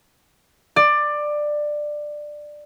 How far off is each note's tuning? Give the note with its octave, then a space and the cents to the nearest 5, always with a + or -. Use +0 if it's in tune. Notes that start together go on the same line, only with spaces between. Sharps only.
D5 +15